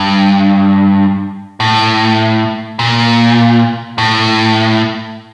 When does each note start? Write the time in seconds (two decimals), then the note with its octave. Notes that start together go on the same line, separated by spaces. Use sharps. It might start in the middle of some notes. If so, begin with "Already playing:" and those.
Already playing: G2
1.60 A2
2.79 A#2
3.98 A2